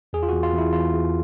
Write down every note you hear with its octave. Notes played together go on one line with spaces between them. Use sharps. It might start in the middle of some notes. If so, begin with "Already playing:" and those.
E2 G#4
F4
E2 F#4
F4
E2 E4
E2 F4
E2